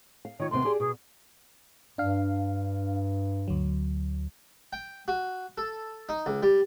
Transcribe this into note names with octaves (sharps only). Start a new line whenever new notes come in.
F5
D#3 F4 C#5
D#2 C3 B3 C6
G4 G#4 D5
B2 G#4
G2 D4 F5
D2 F#3
G5
F#4
A4
D#4
C#2
G3